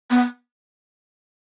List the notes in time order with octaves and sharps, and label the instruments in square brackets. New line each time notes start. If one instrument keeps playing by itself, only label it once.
[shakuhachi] B3